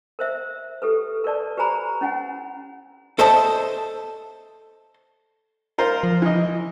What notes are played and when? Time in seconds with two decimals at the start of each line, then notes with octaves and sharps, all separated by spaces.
0.19 A#4 C5 E5
0.82 G4 A4 B4
1.24 A#4 B4 D5 A5
1.57 G4 B4 C5 G#5 A#5 B5
2.01 C#4 E4 F#5 G#5
3.19 A4 C5 D#5 E5 A5
5.78 F4 A#4 C5
6.03 F3
6.22 E3 D#5